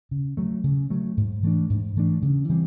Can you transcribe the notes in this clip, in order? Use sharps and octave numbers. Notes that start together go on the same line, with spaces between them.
C#3
F#3 A3
C#3
F#3 A3
G#2
E3 A3 D4
G#2
E3 A3 D4
C#3
E3 G3 C4